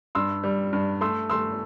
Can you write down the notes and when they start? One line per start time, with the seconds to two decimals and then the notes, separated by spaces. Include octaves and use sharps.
0.15 G2 C6 E6
0.44 G3
0.73 G2
1.01 A3 C6 E6
1.30 A3 C6 E6